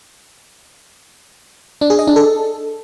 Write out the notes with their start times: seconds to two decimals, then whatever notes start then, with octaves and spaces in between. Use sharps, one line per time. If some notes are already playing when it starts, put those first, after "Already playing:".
1.81 D4
1.90 G#4
1.99 D#5
2.07 D4
2.16 A4